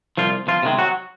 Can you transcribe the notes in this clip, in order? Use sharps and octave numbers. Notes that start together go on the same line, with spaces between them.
C2 F3 F4
F3 F4
C3 D#3 G#3
F#3 F#4